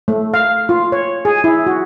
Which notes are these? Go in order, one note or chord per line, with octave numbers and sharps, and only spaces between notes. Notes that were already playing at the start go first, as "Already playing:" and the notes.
A3
F5
F4
C#5
G#4
E4
F#4